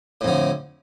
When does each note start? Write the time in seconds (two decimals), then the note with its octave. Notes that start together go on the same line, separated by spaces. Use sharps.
0.21 A2
0.24 F2
0.28 D3